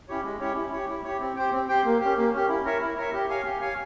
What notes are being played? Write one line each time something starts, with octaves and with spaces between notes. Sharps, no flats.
C#4 E4 G4 C#5
G#3
C#4 E4 G4 C#5
E4
G4 C#5
E4
G4 C#5
C4
G4 C5 G5
C4
G4 C5 G5
A#3
C#4 G4
A#3
C#4 G4
E4
A#4 C#5 E5
E4
A#4 C#5 E5
G4
C#5 F5 G#5
G4
C#5 F5 G#5